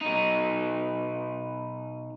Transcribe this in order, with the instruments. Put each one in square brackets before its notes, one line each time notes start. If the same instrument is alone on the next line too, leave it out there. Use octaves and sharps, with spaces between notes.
[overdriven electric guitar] B2 D#4